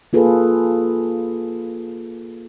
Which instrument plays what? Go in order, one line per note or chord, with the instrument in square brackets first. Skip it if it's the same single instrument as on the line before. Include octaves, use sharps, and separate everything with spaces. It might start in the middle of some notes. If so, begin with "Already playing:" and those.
[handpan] A#3 F4 G#4 A4 B4